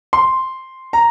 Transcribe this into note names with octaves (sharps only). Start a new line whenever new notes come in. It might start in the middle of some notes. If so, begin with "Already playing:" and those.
C6
A#5